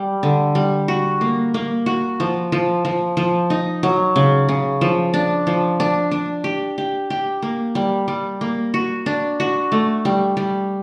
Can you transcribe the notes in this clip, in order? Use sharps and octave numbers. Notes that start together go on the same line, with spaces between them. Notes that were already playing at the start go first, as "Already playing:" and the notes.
Already playing: G3
D3
G3
F#4
A#3
A#3
F#4
F3
F3
F3
F3
D#4
F#3
C#3
C#3
F3
D4
F3
D4
D4
G4
G4
G4
A#3
G3
G3
A#3
F#4
D4
F#4
A3
G3
G3